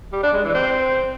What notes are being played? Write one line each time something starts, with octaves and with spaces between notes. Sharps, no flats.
G3
D4
G#3
E3
C4